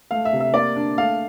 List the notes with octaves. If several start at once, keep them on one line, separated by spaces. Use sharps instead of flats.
A3 F5
E5
C3
E5
A#3 D5
D4
A3 F5